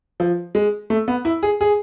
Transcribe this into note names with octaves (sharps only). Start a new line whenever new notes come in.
F3
G#3
A3
B3
E4
G#4
G#4